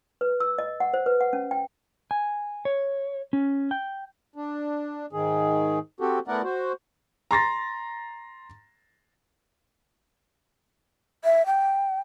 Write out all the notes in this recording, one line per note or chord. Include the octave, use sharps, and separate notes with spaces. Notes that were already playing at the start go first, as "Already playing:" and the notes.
B4
E6
D#5
F#5
C5
B4
F#5
C#4
G5
G#5
C#5
C#4
G5
D4
G#2 D#3 G#4
C4 F#4 G4 A4
A3 B3 E4 A#4 D5 F#5
F#4 C5
A#5 C6 A6 A#6
E5
G5